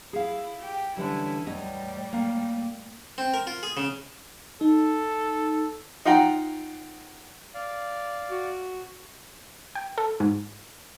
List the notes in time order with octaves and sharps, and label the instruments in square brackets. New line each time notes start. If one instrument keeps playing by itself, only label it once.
[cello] E4 [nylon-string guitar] G#4 F5
[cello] G4
[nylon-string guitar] D3 E3 G3 [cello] C#4 E4
[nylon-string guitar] E2 C#5 D#5 [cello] A2 G3
[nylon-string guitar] A#3
[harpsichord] C4
A#4
F4
G#4
C#3
[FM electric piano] D#4 [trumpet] A4
[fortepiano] D#4 F4 F#5 G5 A#5
[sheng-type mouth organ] D5 F5
[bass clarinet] F#4
[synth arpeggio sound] G5
A4
G#2